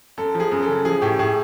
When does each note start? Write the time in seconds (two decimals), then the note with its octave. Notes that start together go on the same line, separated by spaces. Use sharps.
0.17 F#2 A4
0.34 F3
0.40 G#4
0.52 F#2
0.62 A4
0.68 C#3
0.85 F3 G#4
1.02 A2 G4
1.19 A2 G#4